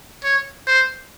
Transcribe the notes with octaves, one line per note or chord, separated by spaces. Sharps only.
C#5
C5